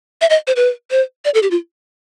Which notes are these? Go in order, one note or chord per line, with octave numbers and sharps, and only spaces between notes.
E5
D#5
C5
B4
C5
D5
A4
G4
F4